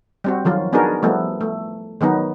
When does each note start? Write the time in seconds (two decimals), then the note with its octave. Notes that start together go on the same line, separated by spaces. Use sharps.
0.24 G3 C4 F#4
0.45 D#3 F3 F#3 F4
0.73 B3 D4 D#4 F#4 G#4 A#4
1.03 F3 G3 A3 B3
1.41 A3
2.01 D#3 F#3 B3 D#4